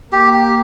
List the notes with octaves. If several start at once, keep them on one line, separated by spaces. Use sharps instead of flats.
A#3 G4
G4